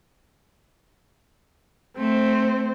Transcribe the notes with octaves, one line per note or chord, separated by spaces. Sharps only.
A3 C4